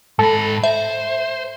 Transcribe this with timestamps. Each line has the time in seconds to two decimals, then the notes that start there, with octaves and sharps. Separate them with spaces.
0.19 G#2 A4 B5
0.64 C5 E5